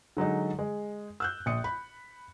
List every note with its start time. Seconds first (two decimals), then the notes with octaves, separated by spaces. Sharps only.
0.17 D3 F#3 G#3 D#4
0.59 G#3
1.20 E6 F#6 G6
1.46 A#1 D#6 C#7
1.64 B5